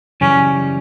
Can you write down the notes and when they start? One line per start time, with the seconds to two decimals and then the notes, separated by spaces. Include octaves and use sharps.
0.21 F#2 C#3 E3 G3 C#4